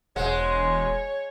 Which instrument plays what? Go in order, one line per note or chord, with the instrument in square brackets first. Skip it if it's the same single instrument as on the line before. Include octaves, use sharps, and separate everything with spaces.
[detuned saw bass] E1 [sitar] G#3 [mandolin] C5 F#5 [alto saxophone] C#5